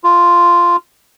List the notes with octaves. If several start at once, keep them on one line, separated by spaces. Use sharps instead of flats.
F4